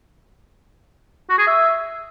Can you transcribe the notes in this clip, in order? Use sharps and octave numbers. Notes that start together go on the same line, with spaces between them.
F#4
G#4
E5